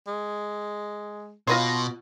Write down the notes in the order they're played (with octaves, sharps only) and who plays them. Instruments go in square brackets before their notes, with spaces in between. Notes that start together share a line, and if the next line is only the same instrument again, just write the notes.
[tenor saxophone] G#3
[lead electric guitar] B2 [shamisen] F4 B4 C#5 [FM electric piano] C6 A#6